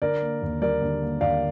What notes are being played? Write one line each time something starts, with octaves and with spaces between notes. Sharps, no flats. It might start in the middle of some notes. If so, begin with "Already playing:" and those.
D3 A#4 D5
A#3
D#2
G3 A#4 D5
D3
A#3
D#2 D5 F5